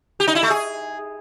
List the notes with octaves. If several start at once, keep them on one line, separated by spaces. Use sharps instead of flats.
G4
D#4
E4
A3
G#4